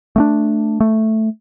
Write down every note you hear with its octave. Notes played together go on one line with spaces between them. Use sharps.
A3 A#3 D4
A3